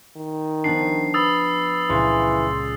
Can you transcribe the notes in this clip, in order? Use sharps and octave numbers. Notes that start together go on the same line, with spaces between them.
D#3
F3 B3 D4 C7
B4 B5 D#6 E6 A6
C#2 A#2 E3 C6